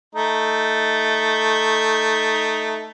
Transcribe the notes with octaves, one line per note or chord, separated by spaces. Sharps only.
A3 D#4